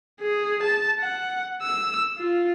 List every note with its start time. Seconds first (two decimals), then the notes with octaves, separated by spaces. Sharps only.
0.20 G#4
0.63 A5
1.00 F#5
1.62 E6
2.18 F4